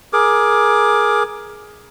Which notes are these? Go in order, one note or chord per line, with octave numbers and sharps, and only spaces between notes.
G#4 A#4 D6